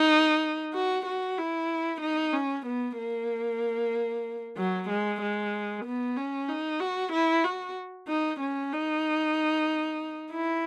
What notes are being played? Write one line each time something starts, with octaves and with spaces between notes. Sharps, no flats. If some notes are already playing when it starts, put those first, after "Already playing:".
Already playing: D#4
F#4
F#4
E4
D#4
C#4
B3
A#3
F#3
G#3
G#3
B3
C#4
D#4
F#4
E4
F#4
D#4
C#4
D#4
E4